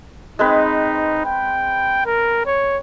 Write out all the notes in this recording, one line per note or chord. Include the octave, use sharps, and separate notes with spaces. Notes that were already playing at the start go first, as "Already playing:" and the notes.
G#3 C4 D#4 B4
G5
A#4
C#5